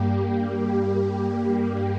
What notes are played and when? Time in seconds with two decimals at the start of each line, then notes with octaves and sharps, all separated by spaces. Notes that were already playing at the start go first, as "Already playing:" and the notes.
Already playing: G2 G3 A#3 G4